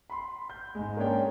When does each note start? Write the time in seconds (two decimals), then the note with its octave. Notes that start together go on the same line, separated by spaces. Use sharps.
0.10 B5 C6
0.50 G6
0.75 G#2 G#3
0.97 A#3 C#4 D4 G#4 C#5 G5